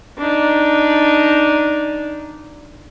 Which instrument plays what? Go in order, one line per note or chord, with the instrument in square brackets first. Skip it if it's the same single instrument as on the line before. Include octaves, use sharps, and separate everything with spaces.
[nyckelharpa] D4 D#4